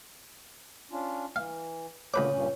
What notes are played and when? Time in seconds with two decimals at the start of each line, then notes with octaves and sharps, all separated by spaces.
0.91 C#4 D4 F4
1.36 E3 F5
2.14 C#2 A#2 D3 B4 C#5 D6
2.31 G2 A#2 C#4